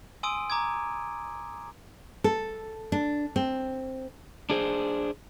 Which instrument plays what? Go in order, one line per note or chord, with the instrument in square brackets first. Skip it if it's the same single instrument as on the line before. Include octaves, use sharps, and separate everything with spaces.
[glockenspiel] G#5 C6 D#6 E6 D7 D#7
A#5 D6 D#6 G#6
[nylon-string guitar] A4
D4
C4
[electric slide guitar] D4 G#4 C5